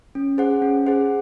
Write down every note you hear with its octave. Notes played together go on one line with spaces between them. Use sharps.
C#4
G#4 C5 F#5
C#4
G#4 C5 F#5